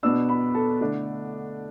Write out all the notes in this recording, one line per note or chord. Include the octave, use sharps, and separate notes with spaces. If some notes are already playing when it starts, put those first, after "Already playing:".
B2 B3 D4 E6
B5
A4
D3 A3 D4